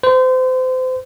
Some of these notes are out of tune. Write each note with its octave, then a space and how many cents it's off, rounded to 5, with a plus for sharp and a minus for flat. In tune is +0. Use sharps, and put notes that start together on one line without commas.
C5 -30